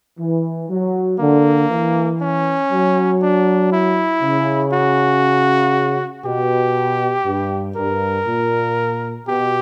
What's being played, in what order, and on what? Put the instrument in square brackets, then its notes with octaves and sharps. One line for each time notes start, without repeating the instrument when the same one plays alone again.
[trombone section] E3
F#3
[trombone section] D3 [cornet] A#3
[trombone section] E3
[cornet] C#4
[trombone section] F#3
[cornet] D4
E4
[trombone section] C#3
[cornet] F#4
[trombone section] B2 [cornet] G4
[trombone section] G2
[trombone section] G2 [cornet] A#4
[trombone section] A#2
[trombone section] B2 [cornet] G4